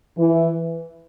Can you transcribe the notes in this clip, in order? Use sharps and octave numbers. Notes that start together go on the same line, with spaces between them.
E3